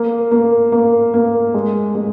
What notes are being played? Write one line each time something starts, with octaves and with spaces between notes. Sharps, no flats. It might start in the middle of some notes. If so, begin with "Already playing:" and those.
Already playing: A#3
A#3
A#3
A#3
G#3
G#3